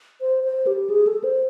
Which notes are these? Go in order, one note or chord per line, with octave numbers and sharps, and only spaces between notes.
C5
C5
G4
G#4
A4
C5